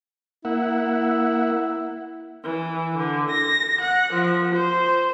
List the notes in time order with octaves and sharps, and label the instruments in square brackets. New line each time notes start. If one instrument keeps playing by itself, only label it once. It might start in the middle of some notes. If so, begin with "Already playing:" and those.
[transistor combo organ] A#3 E5 F#5 [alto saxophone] E4
[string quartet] E3
D3
A#6
F#5
F3
C5